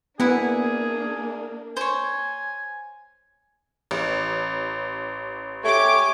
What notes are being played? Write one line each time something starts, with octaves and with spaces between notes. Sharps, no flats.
A#3 B3 D4 E4 G#4 F#5
C5 C#5 G#5
A1
A3 G4 C#5 G#5 D6